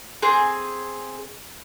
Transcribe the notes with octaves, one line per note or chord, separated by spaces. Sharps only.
C4 G#4